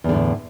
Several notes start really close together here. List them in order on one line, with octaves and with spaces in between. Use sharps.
E2 D3 A2